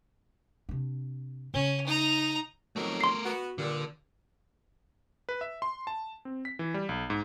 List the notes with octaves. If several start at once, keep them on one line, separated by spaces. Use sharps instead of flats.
C3 D4
C#3 C#4
D#4 A#5
F2 D#3 F#3 A3 A#4
C6 C7
B3 F#4
G2 A#2 D3 G3
B4
E5
C6
A5
C4
B6
E3
G3
B1
G#2